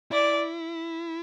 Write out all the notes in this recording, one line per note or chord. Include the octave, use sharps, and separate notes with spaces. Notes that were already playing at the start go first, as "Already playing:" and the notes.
E4 D5